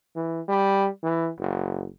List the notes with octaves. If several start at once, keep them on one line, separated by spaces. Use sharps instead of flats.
E3
G3
E3
F#1